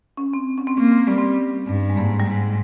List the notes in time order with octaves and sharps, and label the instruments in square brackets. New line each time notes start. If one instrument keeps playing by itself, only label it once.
[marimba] C#4
C4
C#4
C4
[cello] A#3 [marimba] C#4
[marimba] C4
[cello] G3 [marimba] C#4
[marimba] C4
[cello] G2
[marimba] G#3
[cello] G#2 [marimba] A#3
[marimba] G3
[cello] G#2 [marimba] G#3